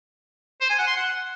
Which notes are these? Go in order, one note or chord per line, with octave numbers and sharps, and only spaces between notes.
C5
G#5
F#5
C6
F#5